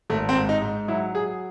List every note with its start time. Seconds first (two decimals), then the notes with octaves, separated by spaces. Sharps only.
0.10 G#1 A3
0.29 C4
0.35 G#2
0.49 D#4
0.62 G#2
0.88 F#3 E4
1.15 F#3 G#4